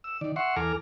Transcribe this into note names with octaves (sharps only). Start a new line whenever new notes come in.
E6
D#3 D5
E5 F#5 C6 C#6
E2 A4 G#5 A#5 D6 F6